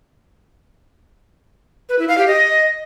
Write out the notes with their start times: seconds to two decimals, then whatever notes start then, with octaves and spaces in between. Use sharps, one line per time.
1.89 B4
1.99 E4
2.08 F5
2.18 G4
2.28 D#5